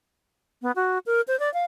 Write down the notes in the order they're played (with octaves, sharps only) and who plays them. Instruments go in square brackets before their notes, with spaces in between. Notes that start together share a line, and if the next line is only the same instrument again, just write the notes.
[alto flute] B3
F#4
A#4
C5
D5
F5